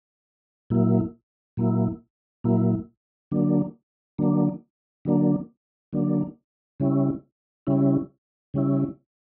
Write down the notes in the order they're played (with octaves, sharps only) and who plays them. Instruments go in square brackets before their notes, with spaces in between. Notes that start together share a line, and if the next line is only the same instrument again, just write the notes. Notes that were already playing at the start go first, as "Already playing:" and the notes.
[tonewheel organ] A#2 F#3 A#3 E4
A#2 F#3 A#3 E4
A#2 F#3 A#3 E4
D3 F#3 A#3 D4
D3 F#3 A#3 D4
D3 F#3 A#3 D4
D3 F#3 A#3 D4
C#3 G3 C#4 E4
C#3 G3 C#4 E4
C#3 G3 C#4 E4